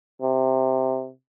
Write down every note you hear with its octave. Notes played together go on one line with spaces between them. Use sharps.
C3